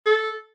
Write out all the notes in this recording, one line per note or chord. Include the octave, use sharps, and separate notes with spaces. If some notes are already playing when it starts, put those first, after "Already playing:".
A4